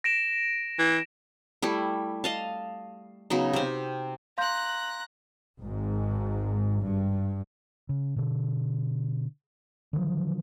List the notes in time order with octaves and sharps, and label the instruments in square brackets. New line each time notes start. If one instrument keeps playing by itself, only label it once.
[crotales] A#6 D7 E7
[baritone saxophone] E3
[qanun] G3 A3 E4
D#5 F5 A5
C#3 F#3 B3 D#4
C3 C4
[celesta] F5 C6 G6 [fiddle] A#5 F#6
[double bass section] G#1 G#2
G2
[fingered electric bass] C#3
B2 D3
D3 D#3 F3 F#3